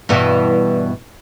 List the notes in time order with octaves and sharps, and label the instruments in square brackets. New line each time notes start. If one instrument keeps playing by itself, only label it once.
[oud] G2 B2 E3